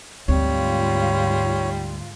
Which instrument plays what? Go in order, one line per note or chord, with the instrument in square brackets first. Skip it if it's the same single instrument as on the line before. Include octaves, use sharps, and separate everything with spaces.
[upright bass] D2 C4 [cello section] G#2 F4 [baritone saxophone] G3 [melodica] C#5